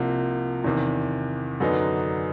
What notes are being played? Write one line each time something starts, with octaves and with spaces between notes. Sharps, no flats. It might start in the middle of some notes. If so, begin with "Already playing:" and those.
Already playing: C2 C3 F3 A#3
E2 C3 D#3
F#2 D3 F#3 B3 D#4